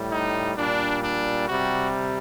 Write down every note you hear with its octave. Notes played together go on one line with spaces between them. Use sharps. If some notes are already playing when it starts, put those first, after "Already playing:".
Already playing: A2 G3
D#4
A#2 G3 D4
D4
C3 G3 F#4